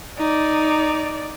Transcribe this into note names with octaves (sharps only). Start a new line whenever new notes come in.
D#4 D5